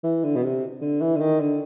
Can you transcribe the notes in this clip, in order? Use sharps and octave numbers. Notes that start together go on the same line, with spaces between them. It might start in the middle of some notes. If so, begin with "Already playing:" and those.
E3
D3
B2
C3
D3
E3
D3
D#3
D3